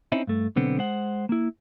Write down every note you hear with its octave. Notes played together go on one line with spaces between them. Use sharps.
C4 C#4 D#4 E4
G2 A3
B1 D3 B3 C4
G#3 C5 F#5
A#3 E4